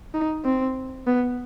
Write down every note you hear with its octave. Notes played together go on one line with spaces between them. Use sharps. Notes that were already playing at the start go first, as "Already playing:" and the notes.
D#4
C4
B3